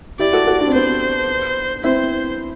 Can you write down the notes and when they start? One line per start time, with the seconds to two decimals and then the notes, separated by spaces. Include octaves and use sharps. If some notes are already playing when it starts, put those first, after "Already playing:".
0.20 E4 G4 D5
0.33 F#4 A4
0.47 F#4 A4
0.60 D4 F#4
0.68 C4
0.75 B3 D4 C5
1.84 C4 E4 C5